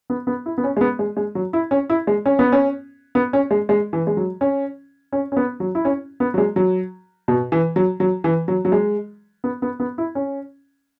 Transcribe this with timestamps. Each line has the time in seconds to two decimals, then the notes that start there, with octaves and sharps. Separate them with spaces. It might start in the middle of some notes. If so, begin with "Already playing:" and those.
0.10 B3
0.27 B3
0.46 E4
0.58 B3
0.64 C#4
0.77 G#3
0.81 B3
0.99 G#3
1.17 G#3
1.35 F#3
1.53 E4
1.71 C#4
1.90 E4
2.07 G#3
2.26 C#4
2.39 B3
2.52 C#4
3.15 B3
3.33 C#4
3.51 G#3
3.69 G#3
3.93 E3
4.07 G#3
4.17 F#3
4.41 C#4
5.12 C#4
5.32 C#4
5.37 B3
5.60 F#3
5.75 E4
5.85 C#4
6.20 B3
6.34 F#3
6.38 G#3
6.56 F#3
7.28 B2
7.52 E3
7.76 F#3
8.00 F#3
8.24 E3
8.48 F#3
8.65 F#3
8.72 G#3
9.44 B3
9.62 B3
9.80 B3
9.98 E4
10.15 C#4